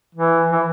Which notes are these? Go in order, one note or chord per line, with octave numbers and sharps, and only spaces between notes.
E3
E3